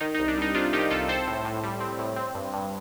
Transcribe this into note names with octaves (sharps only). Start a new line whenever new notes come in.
D#3 D#4
D#4
C2
D4
G3 D#4
C3 D4 F4
D#3 D#4 G4
C2 F4 A4
C4 A4 C5
A2
A2
G3
C4
A2
C4
G2
G2